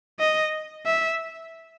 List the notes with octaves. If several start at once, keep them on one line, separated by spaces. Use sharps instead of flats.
D#5
E5